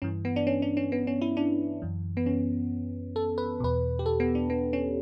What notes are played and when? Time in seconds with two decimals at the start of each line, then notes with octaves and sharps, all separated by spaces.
0.02 G2 E3 C#4
0.25 B3
0.36 D4
0.47 C#4
0.62 D4
0.77 C#4
0.92 B3
1.07 C#4
1.21 E4
1.37 D4
1.82 F#2 E3
2.17 B3
2.26 C#4
3.16 A4
3.38 B4
3.60 E2 B2 B4
3.99 G4
4.06 A4
4.20 B3
4.35 D4
4.50 B3
4.73 C#4